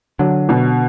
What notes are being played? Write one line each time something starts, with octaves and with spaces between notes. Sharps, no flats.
D3 F#3
B2